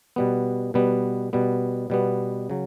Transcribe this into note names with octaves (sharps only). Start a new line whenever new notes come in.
B2 G3 B3
B2 G3 B3
B2 G3 B3
B2 G3 B3
C#3 F#3